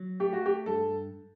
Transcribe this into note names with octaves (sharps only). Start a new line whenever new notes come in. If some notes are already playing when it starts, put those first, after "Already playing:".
Already playing: F#3
A3 G4
F#4
G4
G2 A4